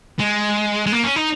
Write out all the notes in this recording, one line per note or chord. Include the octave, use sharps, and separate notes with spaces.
G#3
G#3
A#3
C#4
D#4